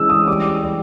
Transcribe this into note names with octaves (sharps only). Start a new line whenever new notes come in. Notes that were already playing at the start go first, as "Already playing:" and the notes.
Already playing: E3 G#3 C#4 E6
D#6
G3 D6
G3